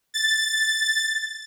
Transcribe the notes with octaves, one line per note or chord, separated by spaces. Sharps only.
A6